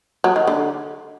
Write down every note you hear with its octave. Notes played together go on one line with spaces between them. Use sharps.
F#3
D#3
D3